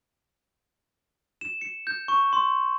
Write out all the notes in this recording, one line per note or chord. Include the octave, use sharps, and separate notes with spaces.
E7
C#7
G6
C#6
C6